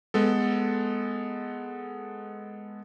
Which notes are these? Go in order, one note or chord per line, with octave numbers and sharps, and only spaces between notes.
G#3 B3 A4